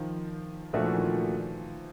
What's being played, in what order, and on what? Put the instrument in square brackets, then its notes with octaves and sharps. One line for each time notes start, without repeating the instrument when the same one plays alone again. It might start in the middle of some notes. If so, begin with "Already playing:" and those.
Already playing: [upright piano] D#3 F3
[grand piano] A#2 F#3 A3 D4 F#4 [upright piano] F3
[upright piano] E3
D#3